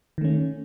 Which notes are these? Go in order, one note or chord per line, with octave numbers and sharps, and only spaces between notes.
D#3 A3 C#4